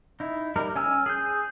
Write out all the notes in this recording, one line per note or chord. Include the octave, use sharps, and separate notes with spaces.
D#4 E4
G3 D#4 A#4
C#4 G#5 E6 F6
G#4 G6